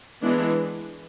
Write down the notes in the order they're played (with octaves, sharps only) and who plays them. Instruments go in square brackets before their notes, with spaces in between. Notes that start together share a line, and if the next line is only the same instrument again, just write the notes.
[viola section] E3 G#3 B3 D4